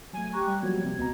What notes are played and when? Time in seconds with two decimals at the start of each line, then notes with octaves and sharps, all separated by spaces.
0.13 F#3 A3 G#5
0.34 G4 A#5 C#6 F#6
0.47 G3
0.63 F3 F#3 A#3 B3 G#6
0.84 C3
0.99 C#2 B2 A#5